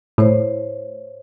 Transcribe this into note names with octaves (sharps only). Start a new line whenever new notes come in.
A2 C5 C#5